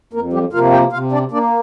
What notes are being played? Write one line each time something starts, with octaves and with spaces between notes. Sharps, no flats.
F2 A#3 A#4
G3 G4
C3 F3 A#3 F4 F5
G4 G5
C3 F4 F5
D4 D5
A#3 D4 D5